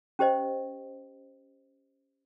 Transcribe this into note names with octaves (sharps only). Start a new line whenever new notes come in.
C#4 G4 C5 D#5